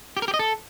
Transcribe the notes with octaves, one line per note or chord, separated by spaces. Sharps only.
G4
A#4
G4
D#5
A4